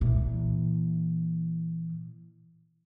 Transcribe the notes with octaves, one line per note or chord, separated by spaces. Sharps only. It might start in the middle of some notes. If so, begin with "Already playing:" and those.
A#2 E3